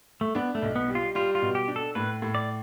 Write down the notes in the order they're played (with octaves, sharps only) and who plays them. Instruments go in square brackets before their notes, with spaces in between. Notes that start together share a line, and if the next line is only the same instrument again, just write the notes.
[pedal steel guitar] A3
[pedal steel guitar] B3 [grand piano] D4
[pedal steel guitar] A3
[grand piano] B1
[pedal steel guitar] B3
[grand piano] G3
[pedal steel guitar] F4
[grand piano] G3 [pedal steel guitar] F4
[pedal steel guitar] F4
[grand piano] B2
[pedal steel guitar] G4
[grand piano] D4
[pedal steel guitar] A4
[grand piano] A2 [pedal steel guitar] B4
[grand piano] A2
[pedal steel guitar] D5